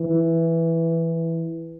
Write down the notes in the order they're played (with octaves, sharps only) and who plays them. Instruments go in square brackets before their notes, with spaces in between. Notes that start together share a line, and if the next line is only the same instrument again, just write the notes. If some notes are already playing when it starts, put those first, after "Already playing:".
Already playing: [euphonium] E3